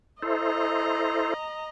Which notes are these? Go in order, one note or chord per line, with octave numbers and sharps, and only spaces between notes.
E4 A4 C5 D#5 A#5